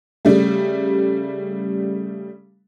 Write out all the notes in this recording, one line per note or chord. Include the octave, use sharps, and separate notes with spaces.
C#3 G3 A3